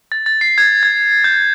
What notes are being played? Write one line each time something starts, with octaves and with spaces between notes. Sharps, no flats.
A6
A6
C7
G#6
G#6
G6